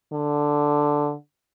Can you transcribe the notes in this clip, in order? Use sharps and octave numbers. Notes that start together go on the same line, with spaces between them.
D3